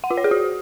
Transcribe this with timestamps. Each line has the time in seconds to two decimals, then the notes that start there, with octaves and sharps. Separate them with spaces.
0.04 F#5
0.11 F4
0.17 C#5
0.24 G#4
0.31 F#4